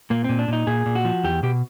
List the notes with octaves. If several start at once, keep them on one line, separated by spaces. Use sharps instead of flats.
A#2 A#3
A#2 C4
D4
A#2 D#4
A#2 G#4
A#2
F#4
F3
E2 G4
B2 G4